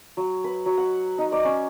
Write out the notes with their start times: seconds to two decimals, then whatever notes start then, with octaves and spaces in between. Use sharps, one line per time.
0.17 F#3
0.44 B4
0.66 F#3
0.78 F#5
1.18 D#4
1.32 D5
1.45 C#4